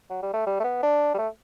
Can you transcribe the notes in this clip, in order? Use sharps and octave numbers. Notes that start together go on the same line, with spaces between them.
F#3
G3
A3
G3
A3
B3
D4
G3
A3